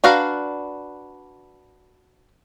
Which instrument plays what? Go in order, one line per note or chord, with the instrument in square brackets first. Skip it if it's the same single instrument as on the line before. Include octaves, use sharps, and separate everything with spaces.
[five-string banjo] D4 F#4 B4 F5 A#5